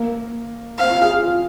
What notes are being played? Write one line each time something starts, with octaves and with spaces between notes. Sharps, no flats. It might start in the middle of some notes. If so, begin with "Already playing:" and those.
Already playing: A#3
C4 F5
F4
G#4
G#4
F4